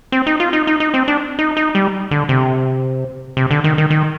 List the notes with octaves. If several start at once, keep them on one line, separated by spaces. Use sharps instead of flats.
C4
D#4
F4
D#4
D#4
D#4
C4
D4
D#4
D#4
G3
D3
C3
C3
D3
D#3
D#3
D#3